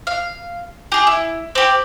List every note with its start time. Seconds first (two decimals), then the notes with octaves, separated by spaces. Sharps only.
0.07 F5
0.92 G4 G#4
1.07 E4
1.55 C4 G4